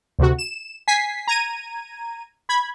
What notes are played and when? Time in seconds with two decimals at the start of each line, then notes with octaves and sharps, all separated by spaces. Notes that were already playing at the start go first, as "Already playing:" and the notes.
0.19 D2 C3 F#4
0.38 E7
0.88 G#5 B6 C7
1.27 A#5 G#6 D#7
2.49 B5 G#6